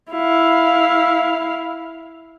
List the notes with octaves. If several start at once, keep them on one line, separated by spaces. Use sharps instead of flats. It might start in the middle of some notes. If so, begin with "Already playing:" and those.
E4 F5